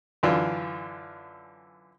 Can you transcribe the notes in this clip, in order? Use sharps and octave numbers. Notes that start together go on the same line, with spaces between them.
F#2 D3 E3 F4 D5